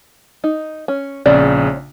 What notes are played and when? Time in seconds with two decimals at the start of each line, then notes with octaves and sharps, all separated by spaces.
0.44 D#4
0.88 C#4
1.26 A#1 C#3 C4 C#4 D5